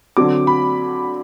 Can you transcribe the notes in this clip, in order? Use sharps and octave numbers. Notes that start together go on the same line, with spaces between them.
D3 F#3 C4 D6
B5